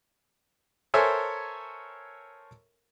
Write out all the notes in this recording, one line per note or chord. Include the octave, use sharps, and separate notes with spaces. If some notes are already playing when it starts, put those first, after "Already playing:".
A4 A#4 C5 C#5 E5 G#5